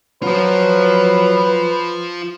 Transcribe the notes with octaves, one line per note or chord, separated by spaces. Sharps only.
F#3 F4 B4 C5